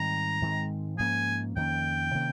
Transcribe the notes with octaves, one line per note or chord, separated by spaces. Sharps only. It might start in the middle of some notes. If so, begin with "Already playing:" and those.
Already playing: G#2 D#3 G3 C4 A#5
G#2 D#3 G#3 C4
G#2 F3 A#3 C#4 G#5
F2 D#3 A#3 C#4 G5
C3 D#3 A#3 C#4